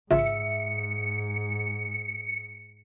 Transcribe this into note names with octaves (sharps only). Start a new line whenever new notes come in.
A1 G#2 C#3 F4 E5 C#7